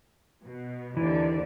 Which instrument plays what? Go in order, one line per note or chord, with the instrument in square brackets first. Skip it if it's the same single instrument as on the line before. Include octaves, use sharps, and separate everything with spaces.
[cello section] B2
[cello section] D#2 D3 D5 [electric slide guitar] E3